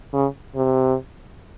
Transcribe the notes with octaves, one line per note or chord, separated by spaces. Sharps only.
C#3
C3